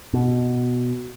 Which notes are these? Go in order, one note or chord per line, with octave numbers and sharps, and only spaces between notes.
B2